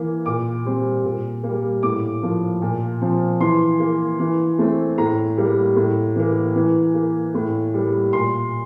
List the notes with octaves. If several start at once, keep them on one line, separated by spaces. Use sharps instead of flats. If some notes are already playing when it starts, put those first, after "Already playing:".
Already playing: E3 A#3
A#2 D6
G3 C4
A#2
A#3
G3
A2 D6
F3 A#3
A#2
F3 C4
E3 C6
A#3
E3
A3 C4
A2 A#5
G3 A#3
A2
E3 A#3
E3
A#3
A2
G3 A#3
A#2 C6